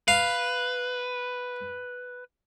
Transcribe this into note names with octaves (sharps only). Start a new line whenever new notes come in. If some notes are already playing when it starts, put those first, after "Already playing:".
B4 F5